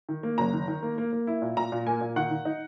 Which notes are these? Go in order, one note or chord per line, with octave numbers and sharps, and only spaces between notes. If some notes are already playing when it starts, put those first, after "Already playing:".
D#3
A#3
F#1 A#5
D#3
D#3
A#3
A#3
A#3
E4
A#2
A#2 A#5
A#2
A#3 G#5
A#2
D#3 F#5
D#3
D#4